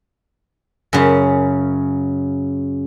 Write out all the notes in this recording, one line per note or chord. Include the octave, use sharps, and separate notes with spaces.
F#2 C#3